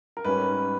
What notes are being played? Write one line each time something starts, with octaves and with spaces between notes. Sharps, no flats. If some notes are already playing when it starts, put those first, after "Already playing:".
A#4
G#2 G3 C#4 B4